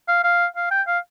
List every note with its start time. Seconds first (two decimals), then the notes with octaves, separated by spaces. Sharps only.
0.08 F5
0.24 F5
0.56 F5
0.71 G5
0.87 F5